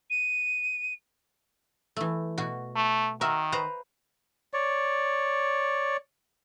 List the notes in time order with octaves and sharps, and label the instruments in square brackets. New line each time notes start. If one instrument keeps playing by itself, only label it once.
[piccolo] D#7
[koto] E3 A3
B2 F#4
[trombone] A3
[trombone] D#3 [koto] F#4 A#4 E5
[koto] B4 C5 A#5
[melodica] C#5 D5